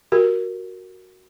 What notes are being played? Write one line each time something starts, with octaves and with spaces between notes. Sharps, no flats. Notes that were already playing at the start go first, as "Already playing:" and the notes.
F#4 G4 A#4